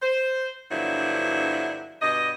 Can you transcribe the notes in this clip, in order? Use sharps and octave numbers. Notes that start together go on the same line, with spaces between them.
C5
G2 D3 F3 F#3 B3 E4
G2 B2 D5 D#5